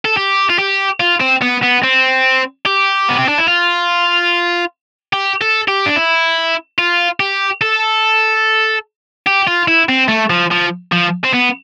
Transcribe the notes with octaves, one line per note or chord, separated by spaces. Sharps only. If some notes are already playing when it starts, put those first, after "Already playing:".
A4
G4
F4
G4
F4
C4
B3
B3
C4
G4
B3
C4
D4
E4
F4
G4
A4
G4
D4
E4
F4
G4
A4
G4
F4
E4
C4
A3
F3
F3
F3
C4
B3